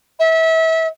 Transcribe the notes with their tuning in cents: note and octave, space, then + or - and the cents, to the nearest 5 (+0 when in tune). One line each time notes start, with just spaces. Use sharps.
E5 -30